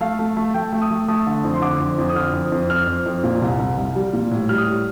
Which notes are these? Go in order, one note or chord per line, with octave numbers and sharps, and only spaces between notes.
A3 F5
A3
A3
A3 G5
A3
D#6
A3
A3 D#6
D3
F2
C6
D3 D6
F2
F2
D#6
D3 F6
F2
F2
F2 F6
F2
F2
A#2
C2
C2
C2
G3
A#2
A2
G3 F6
D#6
A2